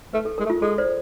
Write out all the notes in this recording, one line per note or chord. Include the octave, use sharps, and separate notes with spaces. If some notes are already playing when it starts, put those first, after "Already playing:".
A3 B4
A4
G#3 A#4
A3
F4
G#3 A4
C5 D5